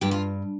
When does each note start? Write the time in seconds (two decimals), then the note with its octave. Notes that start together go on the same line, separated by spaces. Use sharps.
0.01 G2 G4
0.11 F4